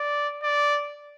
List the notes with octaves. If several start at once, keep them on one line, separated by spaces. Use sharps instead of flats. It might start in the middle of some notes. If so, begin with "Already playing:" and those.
Already playing: D5
D5